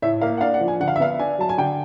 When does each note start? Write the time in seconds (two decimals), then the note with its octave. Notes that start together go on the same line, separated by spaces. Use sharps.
0.02 A2 E5
0.21 A#3 F5
0.38 F#5
0.41 D4 F5
0.54 F#5
0.61 F3
0.68 G#5
0.80 D3 F#5
0.88 F5
0.96 E5
1.00 B3 F5
1.19 D4 G#5
1.39 F#3 A5
1.49 G#5
1.58 D3 G5